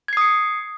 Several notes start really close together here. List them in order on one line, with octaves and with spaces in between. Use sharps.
G#6 C7 D#6 C#7